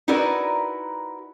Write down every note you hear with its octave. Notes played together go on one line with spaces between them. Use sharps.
D#4 E4 F#4 A#4 B4 D5